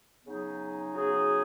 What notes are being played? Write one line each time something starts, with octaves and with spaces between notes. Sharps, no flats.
C#3 F#3 B3 D#4 G#4
C#3 F#3 B3 D#4 G#4